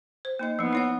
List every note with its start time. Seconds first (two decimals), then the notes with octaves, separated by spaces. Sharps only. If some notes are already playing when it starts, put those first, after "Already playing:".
0.25 C5
0.39 A#3 D#4 D#5
0.59 F3 B3 D#4
0.73 E4 C#5 F#5